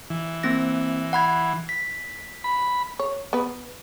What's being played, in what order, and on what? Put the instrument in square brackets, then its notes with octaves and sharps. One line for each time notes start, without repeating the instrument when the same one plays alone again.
[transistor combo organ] E3
[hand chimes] A#3 C4 A#6
F#5 B5 G#6
B6
[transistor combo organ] B5
[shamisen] C#5
B3 B4